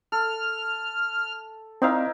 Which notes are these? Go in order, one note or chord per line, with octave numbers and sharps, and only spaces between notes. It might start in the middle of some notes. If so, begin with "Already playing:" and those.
A4 F6
C4 D#4 E4 A#4 D5 F5